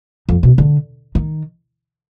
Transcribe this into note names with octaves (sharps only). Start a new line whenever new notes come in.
F2
B2
D3
D#3